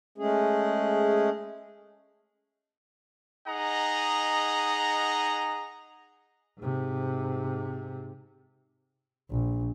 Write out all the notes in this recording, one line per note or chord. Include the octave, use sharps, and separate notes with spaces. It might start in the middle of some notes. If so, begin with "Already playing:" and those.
G#3 A3 C#4 G#4
D#4 G#4 D#5 F#5 A#5
G#2 C3
A#1